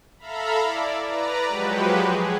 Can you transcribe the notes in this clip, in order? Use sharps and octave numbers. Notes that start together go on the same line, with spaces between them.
A4 E5 F5 A#5 B5
E4 D5
B4 D5 A#5
F3 F#3 G#3 F#4 G4 B4
G#4